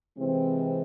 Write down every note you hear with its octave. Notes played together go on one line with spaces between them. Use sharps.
C3 E3 G#3 C4